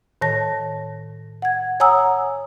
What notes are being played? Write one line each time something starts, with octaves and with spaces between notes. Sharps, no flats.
A2 D#3 C#5 A5 A#6
F#5 G#6
C#5 F#5 G#5 A#5 D#6 E6